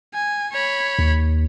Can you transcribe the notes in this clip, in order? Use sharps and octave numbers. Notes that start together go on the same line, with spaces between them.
G#5
C#5 B5
D#2